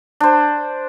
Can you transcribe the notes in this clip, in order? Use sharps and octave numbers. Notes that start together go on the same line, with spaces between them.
D4 C5